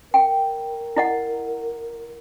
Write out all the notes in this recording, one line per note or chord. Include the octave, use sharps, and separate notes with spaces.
A#4 G5
E4 D#5 F#5